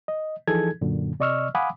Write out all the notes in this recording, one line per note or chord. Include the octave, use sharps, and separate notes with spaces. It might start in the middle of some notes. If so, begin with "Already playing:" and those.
D#5
E3 F3 D#4 G#4 A4 G#6
F#2 A#2 D3
C3 D5 D#5 C#6 E6 F6
F5 F#5 G#5 B5 D6 D#6